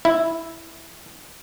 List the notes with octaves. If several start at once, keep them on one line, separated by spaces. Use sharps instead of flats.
E4